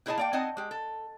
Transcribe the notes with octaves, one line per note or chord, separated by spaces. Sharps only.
A#2 E4 G#4 D#5 G#5 A5
A#3 D5 G5
C4 D#4 D#5 F#5 G#5 A5
G#3 G4
A4